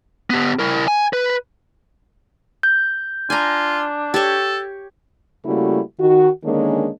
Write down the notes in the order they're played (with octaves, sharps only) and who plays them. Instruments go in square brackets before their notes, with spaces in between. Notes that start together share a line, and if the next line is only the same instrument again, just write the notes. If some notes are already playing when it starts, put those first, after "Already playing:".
[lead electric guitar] B3 G4
E4 A#4
G#5
B4
[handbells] G6
[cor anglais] D4 [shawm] F4 [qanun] G#5 A#5
[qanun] G4 C#5 [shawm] A4
[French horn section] C#3 G3 A3 A#3 E4 F#4
D#3 F#4
D3 D#3 G#3 A#3 C#4 D4